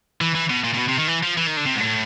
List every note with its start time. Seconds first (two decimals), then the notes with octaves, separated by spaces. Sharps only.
0.21 E3
0.35 E3
0.50 B2
0.64 A#2
0.74 A#2
0.78 B2
0.89 C3
0.98 D#3
1.08 E3
1.23 F3
1.37 E3
1.47 D#3
1.57 D3
1.66 C3
1.76 G#2
1.80 A2